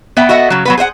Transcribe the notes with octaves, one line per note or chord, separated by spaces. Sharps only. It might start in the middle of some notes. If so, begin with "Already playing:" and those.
B3 E5 G5
F#4 A4 D#5 E5 F#5
C#3 F#3
F#3 B3 B4
G#4 C5 E5 F#5